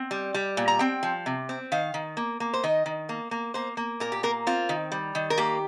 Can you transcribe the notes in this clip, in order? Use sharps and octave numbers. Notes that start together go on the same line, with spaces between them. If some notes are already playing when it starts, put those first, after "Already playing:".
Already playing: C4
G3
G3
A#2
A#5
C4 G5
F3
C3
C4
D#3 F5
D#3
A#3
A#3
C5
D#3 D#5
D#3
A#3
A#3
A#3 C5
A#3
A#2 A#4
G4
A#3 A#4
C4 F4
D#3
G3
D#3
A#4
A#3 G4